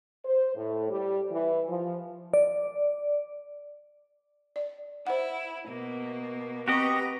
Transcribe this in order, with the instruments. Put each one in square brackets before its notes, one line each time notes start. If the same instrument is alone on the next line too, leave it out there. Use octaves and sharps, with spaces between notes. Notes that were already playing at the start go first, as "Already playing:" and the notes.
[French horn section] C5
A2
G3
E3
F3
[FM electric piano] D5
[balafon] D5
[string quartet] E4 [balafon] C5 F#5
[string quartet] B2 A#3
[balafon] C4 C#6 [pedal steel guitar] F#4 G4 D#5 [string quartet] B4 A#5